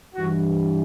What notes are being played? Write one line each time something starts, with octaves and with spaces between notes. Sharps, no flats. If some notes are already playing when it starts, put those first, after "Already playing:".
G2 E3 F#4